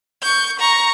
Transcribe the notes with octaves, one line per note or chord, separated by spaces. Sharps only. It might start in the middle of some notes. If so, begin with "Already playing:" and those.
C#6 G6
A#5 C#6